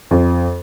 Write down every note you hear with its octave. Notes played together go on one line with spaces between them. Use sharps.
F2